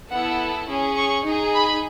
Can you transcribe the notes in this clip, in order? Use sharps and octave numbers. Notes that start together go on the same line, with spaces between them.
B3 E4 A4 F#5
C#4 G#4
C#6
D#4 G#4
B5